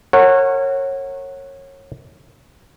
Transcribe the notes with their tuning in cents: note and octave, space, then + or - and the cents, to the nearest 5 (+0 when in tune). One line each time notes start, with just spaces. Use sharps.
A#4 -35 C#5 -25 F#5 +0